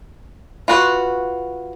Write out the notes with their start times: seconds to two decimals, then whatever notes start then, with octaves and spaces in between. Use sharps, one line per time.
0.68 F4 F#4 B4